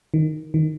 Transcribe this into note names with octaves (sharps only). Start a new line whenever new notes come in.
D#3
D#3